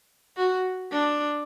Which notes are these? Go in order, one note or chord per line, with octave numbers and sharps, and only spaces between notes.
F#4
D4